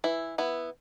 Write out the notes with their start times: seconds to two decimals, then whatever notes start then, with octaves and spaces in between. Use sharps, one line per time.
0.04 E3 E4
0.38 B3 E4